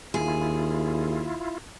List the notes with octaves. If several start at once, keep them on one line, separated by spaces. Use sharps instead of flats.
D#2 E4 F4 G#4